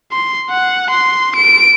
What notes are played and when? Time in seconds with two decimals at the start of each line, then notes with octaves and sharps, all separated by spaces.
0.12 C6
0.50 F#5
0.91 C6
1.36 D7